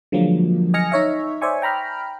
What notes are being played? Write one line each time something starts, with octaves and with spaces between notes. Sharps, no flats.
D3 F3 F#3 G#3 A#3
D#5 G#5 F6 A#6 C#7
D#4 C#5 E5
C5 D5 E5 G#5 C#6
G5 A#5 B5 F6